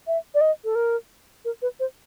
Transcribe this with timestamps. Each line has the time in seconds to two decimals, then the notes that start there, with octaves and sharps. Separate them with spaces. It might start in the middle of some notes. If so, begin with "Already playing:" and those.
0.07 E5
0.35 D5
0.41 D#5
0.64 A4
0.75 A#4
1.45 A#4
1.62 B4
1.80 C5